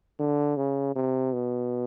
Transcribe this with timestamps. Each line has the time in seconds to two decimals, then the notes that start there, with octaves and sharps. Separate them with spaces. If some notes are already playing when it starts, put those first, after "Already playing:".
0.19 D3
0.57 C#3
0.95 C3
1.33 B2